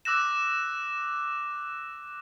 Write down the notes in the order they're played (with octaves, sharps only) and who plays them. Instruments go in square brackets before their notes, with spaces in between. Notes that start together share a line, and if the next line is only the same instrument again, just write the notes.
[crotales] D6 E6 F#6 A#6 E7